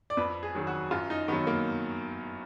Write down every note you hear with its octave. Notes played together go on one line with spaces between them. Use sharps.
D5
F2 B4
G#4
D#3 F#3
F#4
F#2 F4
D#4
D#3 F#3 B3
A#3